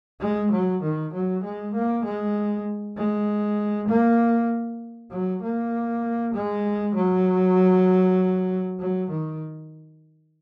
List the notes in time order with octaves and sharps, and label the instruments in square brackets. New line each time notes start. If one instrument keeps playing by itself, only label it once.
[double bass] G#3
F#3
D#3
F#3
G#3
A#3
G#3
G#3
A#3
F#3
A#3
G#3
F#3
F#3
D#3